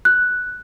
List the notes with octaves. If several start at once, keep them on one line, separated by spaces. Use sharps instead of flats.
F#6